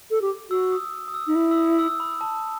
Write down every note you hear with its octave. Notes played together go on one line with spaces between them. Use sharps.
A4
G4
F#4 E6
D#6
D#6
D#6
E6
D#4
E4 D#6
E6
D#6
E6
B5
A5